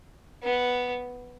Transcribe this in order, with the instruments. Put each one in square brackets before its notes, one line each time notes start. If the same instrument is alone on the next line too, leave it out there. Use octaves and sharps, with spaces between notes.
[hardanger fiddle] B3